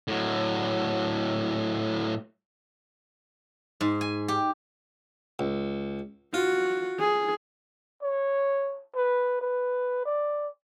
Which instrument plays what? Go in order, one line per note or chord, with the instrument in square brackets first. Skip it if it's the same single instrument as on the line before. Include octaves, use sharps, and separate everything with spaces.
[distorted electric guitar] A2 F#3
[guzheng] G#2
G#5
G4
[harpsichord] C#2
[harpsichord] F4 [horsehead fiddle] F#4
[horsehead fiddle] G#4
[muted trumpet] C#5
B4
B4
D5